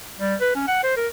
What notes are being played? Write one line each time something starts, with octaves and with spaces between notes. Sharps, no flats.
G3
B4
C#4
F#5
C5
A#4